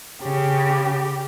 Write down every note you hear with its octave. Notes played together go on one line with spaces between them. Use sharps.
C#3 G4